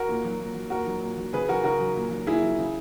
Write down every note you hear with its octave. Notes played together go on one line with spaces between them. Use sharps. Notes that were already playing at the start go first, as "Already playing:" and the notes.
Already playing: F#4 A#4
A#2
F#3
A#2
F#3
A#2 F#4 A#4
F#3
A#2
F#3
C#3 G#4 B4
F#3 F#4 A#4
C#3 F#4 A#4
F#3
A#2
F#3
A#2 E4 G#4
F#3
C#3